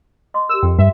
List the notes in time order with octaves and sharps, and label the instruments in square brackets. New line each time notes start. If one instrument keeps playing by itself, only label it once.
[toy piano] D#5 C6 D6
[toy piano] G4 A#4 [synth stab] E6
[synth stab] F2 [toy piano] G5
[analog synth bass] G2 [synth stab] E5